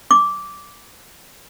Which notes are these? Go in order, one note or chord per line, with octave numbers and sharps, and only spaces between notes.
D6